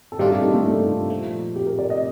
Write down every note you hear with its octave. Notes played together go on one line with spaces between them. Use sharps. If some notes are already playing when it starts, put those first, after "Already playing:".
A4
G2 D#3 A3 D4 F4 G4
G4
D#4
A3
D#4
A#2 F3 A3
G4
A#4
D5
D#5